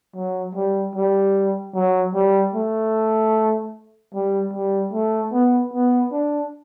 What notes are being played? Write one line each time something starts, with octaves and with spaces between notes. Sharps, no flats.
F#3
G3
G3
F#3
G3
A3
G3
G3
A3
B3
B3
D4